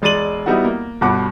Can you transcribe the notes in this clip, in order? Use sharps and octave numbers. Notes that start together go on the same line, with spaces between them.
E1 G#3 D5 A6 D#7 F#7
G3 B3 D#4 E4 F#4
A#3
G1 G2 B2 F#5 D6